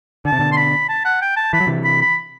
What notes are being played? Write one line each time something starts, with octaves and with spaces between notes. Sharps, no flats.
D3 A5
C3
B2 D3
C6
B5
A5
F#5
G5
A5
E3 B5
F#3
C3 E3
B5
B5